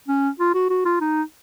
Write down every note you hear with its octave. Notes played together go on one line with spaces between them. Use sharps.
C#4
F4
F#4
F#4
F4
D#4